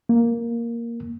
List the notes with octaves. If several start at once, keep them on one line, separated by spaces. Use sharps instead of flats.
A#3